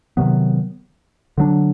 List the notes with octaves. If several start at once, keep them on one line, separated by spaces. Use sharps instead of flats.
C3 D#3 F#3 B3
D3 F#3 B3 D4